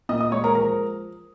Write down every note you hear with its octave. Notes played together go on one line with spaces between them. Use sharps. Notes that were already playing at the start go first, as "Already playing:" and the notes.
A#2 D#5 D#6
D#5 D#6
G#3 C#5 C#6
A#4 A#5
F3 A#4 A#5